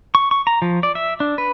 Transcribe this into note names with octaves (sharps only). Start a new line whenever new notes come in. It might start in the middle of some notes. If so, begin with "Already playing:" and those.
C#6
C#6
A#5
F3
D5
E5
D4
B4